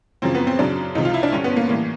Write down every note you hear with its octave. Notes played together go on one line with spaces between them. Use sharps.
F#2 C#3 F3 C4
B3
C4
F#2 C#3 F#3 D4
C#2 C3 F3 D#4
F4
E4
D4
G2 D3 G3 C#4
B3
A#3
A2 E3 G3 A#3